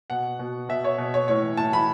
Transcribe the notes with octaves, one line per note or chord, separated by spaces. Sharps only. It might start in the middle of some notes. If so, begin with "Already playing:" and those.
B2 F#5
B2
B2 E5
C#5
B2
C#5
A2 C#5
E3
A2 A5
E3 B5